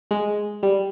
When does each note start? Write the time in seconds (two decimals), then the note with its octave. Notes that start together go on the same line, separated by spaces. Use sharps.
0.11 G#3
0.63 G3